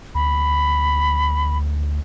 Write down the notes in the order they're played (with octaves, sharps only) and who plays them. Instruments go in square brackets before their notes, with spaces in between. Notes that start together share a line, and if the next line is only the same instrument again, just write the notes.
[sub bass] D2 [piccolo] B5